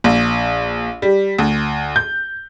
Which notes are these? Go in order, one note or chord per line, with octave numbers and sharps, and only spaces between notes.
A#1
G3
D2
G6